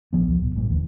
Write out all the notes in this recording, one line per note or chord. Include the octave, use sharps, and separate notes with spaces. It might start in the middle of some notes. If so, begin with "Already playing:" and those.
A#1 F3 B3
C#2 F3
D1 B2
A1 G2 A#2 G3
D#1 D2 E3